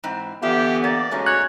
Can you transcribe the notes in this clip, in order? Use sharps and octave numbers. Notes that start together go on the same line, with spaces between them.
G#2 E3 C4
D3 E3 B3 F4 G4 E5
A#3 D5
G#2 G#3 A3 C#4 F#4
C#5 F#6